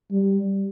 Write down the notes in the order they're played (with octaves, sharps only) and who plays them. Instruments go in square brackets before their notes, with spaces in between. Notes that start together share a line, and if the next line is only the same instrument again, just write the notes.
[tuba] G3